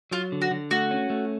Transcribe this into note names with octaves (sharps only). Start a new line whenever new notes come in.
F#3 F4
D3
F#4
D3
A3 F#4
C#4
A3